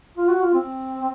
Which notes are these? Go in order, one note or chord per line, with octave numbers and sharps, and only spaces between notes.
F4
F#4
F4
C4